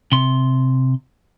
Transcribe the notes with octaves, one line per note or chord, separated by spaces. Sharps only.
C3 C6